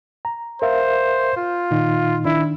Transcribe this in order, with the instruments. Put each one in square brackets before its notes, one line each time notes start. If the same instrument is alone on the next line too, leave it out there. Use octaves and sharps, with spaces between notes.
[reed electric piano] A#5
[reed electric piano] A#4 E5 F5 [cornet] C5
[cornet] F4
[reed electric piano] A#2 D#3 D#4
[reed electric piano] D#3 D4 [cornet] E4